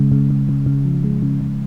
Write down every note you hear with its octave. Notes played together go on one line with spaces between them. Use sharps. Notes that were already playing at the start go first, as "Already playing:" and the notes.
Already playing: C#3 G#3
C#3
C#3
C#3
C#3
F3
G#3
C#3
C#3